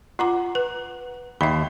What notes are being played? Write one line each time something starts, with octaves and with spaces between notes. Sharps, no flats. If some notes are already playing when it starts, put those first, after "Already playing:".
F4 F#5 A#5 D6
B4
D#2 E5 B5 B6